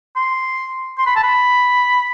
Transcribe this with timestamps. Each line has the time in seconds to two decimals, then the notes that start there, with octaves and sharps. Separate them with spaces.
0.16 C6
0.98 C6
1.07 B5
1.16 A5
1.23 B5